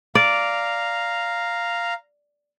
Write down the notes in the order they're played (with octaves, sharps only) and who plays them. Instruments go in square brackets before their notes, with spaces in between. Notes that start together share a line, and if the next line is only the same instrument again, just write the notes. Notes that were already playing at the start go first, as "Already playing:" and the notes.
[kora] D5 [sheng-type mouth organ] F5 A#5